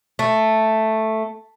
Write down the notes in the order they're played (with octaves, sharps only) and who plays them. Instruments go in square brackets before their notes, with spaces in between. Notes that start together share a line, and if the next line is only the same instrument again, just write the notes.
[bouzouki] A3